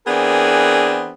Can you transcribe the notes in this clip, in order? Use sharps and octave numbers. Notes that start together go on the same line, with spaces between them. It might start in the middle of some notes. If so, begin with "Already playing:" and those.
E3 B3 C4 D4 G#4 A#4